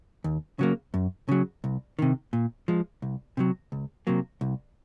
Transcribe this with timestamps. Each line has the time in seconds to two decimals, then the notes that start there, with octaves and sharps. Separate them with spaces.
0.24 D#2
0.59 C#3 F#3 A#3
0.94 F#2
1.29 C#3 F#3
1.64 C2
1.99 C3 D#3
2.33 A#2
2.68 F3 G#3
3.02 C2
3.37 C3 D#3 F#3
3.72 C#2
4.07 C3 F#3 A#3
4.41 C2